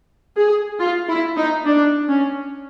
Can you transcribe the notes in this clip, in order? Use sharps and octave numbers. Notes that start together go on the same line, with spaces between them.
G#4
F4
E4
D#4
D4
C#4